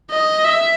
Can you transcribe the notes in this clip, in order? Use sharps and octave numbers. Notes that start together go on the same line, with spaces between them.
D#5
E5